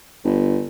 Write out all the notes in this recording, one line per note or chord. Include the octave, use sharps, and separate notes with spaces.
G1